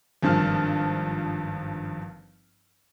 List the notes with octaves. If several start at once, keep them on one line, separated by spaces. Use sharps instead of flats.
G#1 G2 F3 A5 F6